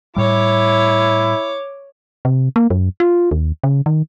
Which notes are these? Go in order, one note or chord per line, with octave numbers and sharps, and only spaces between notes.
A2 G3 E4 C#5 D6
C3
A#3
F#2
F4
D#2
C#3
D#3